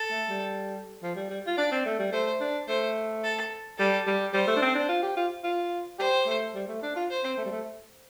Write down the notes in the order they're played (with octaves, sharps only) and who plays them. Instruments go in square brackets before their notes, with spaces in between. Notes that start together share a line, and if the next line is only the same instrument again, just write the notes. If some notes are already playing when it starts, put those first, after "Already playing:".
Already playing: [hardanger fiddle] A4
[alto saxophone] A3
G3
F3
G3
G3
F4
[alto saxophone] D4 [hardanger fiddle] D5
[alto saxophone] C4
A3
G3
[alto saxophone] A3 [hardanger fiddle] C5
[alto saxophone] D4
[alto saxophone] A3 [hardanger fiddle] C5
[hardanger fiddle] A4
[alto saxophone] G3 [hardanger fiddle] A4
[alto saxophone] G3
[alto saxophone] G3 [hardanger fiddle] C5
[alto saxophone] A3
D4
C4
D4
F4
G4
F4
F4
[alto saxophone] G4 [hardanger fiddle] C5
[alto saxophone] A3
G3
A3
D4
F4
[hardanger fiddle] C5
[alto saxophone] C4
A3
G3
A3